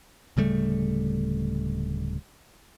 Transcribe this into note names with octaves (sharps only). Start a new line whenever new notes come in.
D1 C#3 G3 A3